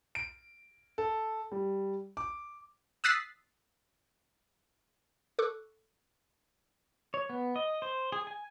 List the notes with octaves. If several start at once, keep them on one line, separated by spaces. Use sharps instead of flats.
D7
A4
G3
D6
D#6 E6 F#6 A6 B6 C7
A4 C#6 D6 F#6
C#5
B3
D#5
C5
G#4
G#5